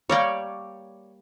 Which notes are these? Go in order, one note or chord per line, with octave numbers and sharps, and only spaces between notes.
G3 A#3 C#5 D5 G5